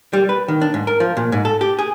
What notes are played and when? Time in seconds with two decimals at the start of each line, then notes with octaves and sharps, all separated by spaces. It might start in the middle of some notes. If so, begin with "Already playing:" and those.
0.13 G3
0.29 B4
0.48 D#3
0.61 D4
0.74 G#2
0.87 A#4
1.00 F3
1.17 A#2
1.32 G#2
1.45 A4
1.61 G4
1.79 G#4